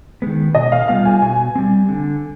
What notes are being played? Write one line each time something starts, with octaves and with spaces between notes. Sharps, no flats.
D#3 G#3 B3
B2 D#5
F5
G3 B3 F4 F5
G#5
B2 G#5
G3 C4
D3